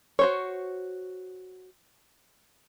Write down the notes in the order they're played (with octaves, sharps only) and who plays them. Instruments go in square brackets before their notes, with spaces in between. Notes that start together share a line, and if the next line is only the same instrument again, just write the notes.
[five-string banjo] F#4 C5 C#5